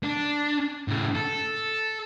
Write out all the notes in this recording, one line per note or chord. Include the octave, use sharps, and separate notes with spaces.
D4
A2 C#3
A4